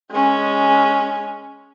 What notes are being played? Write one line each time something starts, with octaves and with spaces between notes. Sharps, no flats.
G#3 C#4